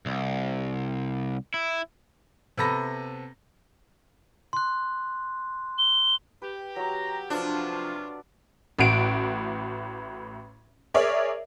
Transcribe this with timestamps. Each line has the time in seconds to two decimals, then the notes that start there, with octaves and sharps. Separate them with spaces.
0.06 C2
1.54 E4
2.57 C3 B3 A4 B5 A#6
4.53 C6 F#6
5.78 G7
6.42 G4 B4
6.76 F#3 F#4 A#5
7.30 C3 F3 F#3 D4 F4 F#4 A4 B4
8.79 A1 A2 F#4 F#5 D7
10.94 G#4 A#4 C#5 D5 E5